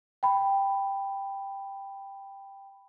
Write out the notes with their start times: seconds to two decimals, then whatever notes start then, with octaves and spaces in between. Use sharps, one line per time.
0.23 G5 B5